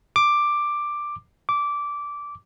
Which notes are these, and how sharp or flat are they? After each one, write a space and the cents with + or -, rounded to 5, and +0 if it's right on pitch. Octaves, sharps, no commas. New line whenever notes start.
D6 +5
D6 -15